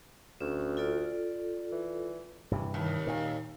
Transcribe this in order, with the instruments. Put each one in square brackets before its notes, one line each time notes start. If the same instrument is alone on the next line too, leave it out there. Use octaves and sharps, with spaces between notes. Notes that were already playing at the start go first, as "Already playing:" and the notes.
[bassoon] D2 [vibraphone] C#4
[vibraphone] F4 A4 D5
[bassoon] E3
[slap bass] G2 C3 E3
[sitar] D#2
[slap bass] A#2 D#3